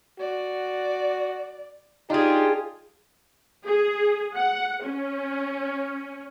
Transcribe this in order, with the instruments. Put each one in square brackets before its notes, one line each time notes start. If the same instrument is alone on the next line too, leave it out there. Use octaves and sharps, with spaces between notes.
[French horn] F#4 [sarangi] D5
[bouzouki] D4 G#4 [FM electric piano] D#4 [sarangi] F4 [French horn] G4
[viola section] G#4
F#5
C#4